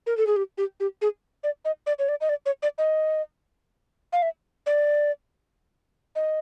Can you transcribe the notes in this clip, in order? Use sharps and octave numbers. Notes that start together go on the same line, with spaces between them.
A#4
A4
G#4
G4
G4
G4
G#4
D5
D#5
D5
C#5
D5
D#5
D5
C#5
D5
D#5
F5
E5
D5
D#5